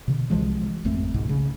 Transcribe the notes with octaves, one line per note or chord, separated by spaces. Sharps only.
B2 D3
C2 E3 F3 G#3
G#1 F2 A3 C4
C#2 G#2 B2
C#3